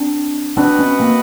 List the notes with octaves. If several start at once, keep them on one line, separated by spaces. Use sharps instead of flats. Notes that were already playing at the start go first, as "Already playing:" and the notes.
Already playing: C4 D4
C4 D4 F#4 B4 D#5 F#5
B3 C#4
A#3 C4